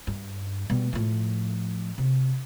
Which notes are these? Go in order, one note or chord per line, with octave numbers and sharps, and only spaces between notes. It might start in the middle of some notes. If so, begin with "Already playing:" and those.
G2
B2 G3
A2 F3
C3